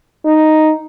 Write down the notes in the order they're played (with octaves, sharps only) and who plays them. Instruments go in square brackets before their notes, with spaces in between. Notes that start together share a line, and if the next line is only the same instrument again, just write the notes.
[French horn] D#4